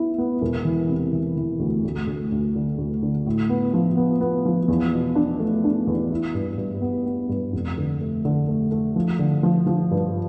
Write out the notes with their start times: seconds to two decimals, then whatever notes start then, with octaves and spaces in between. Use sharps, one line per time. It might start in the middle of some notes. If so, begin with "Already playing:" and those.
Already playing: B3 E4
0.18 B3
0.41 E1
0.65 E3
0.89 C3
1.13 E3
1.37 E3
1.59 D2
1.84 D2
2.07 D2
2.32 D2
2.55 D3
2.78 D2
3.03 D3
3.26 A2
3.49 B3
3.74 F3
3.97 B3
4.20 B3
4.45 F3
4.68 E2
4.93 B2
5.15 D4
5.39 A3
5.64 D4
5.87 E2
6.11 E4
6.35 G2
6.58 G2
6.82 B3
7.06 B3
7.29 G2
7.53 F1
7.78 D3
8.01 A3
8.25 D3
8.48 A3
8.71 A3
8.96 F3
9.19 D3
9.43 F3
9.67 F3
9.91 G2